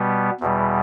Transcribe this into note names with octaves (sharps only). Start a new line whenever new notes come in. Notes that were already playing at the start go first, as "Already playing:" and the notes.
Already playing: B2 G3 B3
E2 B2 G3